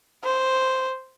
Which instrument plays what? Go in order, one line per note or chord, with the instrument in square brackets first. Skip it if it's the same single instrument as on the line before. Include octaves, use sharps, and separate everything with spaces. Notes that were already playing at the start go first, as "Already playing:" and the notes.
[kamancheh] C5